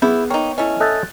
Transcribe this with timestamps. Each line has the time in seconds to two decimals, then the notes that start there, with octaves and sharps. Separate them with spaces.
0.02 B3 E4 G#4 G6
0.30 A#3 D#4 C#5 G5
0.58 A3 C#4 E4 D#5
0.80 A4 D#5 E5 F#6 G6 A6